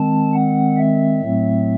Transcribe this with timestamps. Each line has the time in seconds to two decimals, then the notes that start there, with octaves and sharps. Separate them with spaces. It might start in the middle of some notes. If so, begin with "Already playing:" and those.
Already playing: D#3 G#3 C4 A5
0.34 F#5
0.77 E5
1.21 A2 F#3 A3 C4